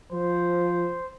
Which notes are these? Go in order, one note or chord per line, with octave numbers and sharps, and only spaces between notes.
F3 C5